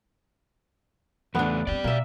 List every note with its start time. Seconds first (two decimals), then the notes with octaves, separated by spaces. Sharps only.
1.35 E2 A3 B3 D4
1.67 A3 C4 D5 G5
1.84 B2 A#3 E5